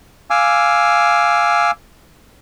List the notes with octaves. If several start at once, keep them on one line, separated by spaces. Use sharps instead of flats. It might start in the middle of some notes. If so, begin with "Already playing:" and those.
F5 G#5 D6 E6